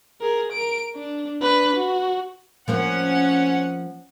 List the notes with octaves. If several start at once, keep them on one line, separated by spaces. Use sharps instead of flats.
G#4 A#4
A#4 D7
D4
D4 B4
F#4
F3 A#3 C4 C#4 F#5